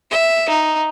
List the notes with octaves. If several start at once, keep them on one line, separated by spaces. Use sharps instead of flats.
E5
D#4